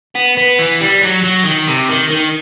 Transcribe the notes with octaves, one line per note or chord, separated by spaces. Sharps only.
B3
B3
E3
G3
F#3
F#3
D#3
C3
D#3
D#3